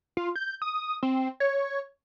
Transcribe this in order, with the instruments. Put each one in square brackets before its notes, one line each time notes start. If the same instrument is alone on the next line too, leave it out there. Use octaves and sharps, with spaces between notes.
[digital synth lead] F4
G6
D#6
C4
C#5